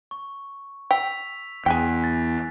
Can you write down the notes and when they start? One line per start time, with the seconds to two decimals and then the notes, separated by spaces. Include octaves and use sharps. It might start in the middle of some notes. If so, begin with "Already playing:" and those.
0.11 C#6
0.91 G5 E6 B6 F7
1.66 E2 G#4 G5 G#5 F#6 B6
2.04 A6